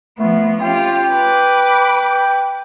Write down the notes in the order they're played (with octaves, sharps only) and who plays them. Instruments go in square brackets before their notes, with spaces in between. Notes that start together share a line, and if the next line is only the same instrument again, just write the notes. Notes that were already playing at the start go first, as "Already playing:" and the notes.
[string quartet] F3 B3 [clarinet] A3
[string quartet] C#4 F4 G4 [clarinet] G5
[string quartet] B4 B5 D6